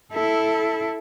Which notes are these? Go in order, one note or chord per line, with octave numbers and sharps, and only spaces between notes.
E4 A4